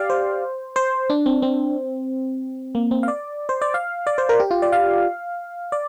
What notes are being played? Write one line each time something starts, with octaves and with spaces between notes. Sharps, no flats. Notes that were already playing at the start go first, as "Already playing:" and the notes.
Already playing: G4 D5 F5
C5
C5
D4
C4
C4
A#3
C4
F5
D5
C5
D5
F5
D5
C5
A#4
G4
F4
D5
F5
D5